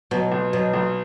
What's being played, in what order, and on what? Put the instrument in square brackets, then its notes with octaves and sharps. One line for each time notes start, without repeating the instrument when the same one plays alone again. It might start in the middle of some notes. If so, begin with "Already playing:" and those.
[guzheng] B2 [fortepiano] F#3
[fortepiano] B1
[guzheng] B2 [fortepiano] F#3
[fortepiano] B1